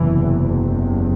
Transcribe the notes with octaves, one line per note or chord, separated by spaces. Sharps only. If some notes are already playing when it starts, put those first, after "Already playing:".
Already playing: F#1 E2 C3 E3